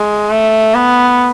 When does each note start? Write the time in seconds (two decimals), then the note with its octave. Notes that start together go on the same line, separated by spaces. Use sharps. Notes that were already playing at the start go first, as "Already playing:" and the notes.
Already playing: G#3
0.30 A3
0.74 B3